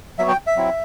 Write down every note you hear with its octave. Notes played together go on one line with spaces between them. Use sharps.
F#3 B3 F#4 E5
G5
E5
F#3 C4 E4